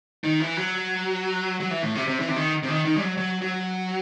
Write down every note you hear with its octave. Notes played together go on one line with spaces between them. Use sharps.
D#3
E3
F#3
F#3
E3
A2
C3
C3
E3
C3
D#3
C3
D#3
D#3
G3
F#3
F#3
F#3